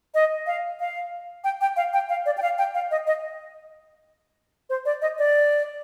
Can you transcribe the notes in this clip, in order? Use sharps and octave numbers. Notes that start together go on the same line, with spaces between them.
D#5
F5
F5
G5
G5
F5
G5
F5
D5
G5
F5
G5
F5
D#5
D#5
C5
D5
D#5
D5